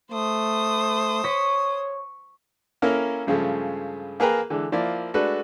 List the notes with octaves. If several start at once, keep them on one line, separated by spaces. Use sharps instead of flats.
A3 C5 D#6
C#5 C#6 B6
A#3 C#4 E4 A4 A#4
G2 C#3 F3 G#3 A3
A#3 G#4 A#4 B4 G5 A#5
D3 E3 G#3
F3 A#3 E4 D5
G#3 A3 D4 F#4 A4 B4